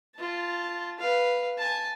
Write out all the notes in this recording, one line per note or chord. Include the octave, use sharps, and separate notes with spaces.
F4 A5
B4 F5
G#5 A5